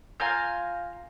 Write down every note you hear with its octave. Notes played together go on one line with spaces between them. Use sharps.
F4 G#5 A#5 G6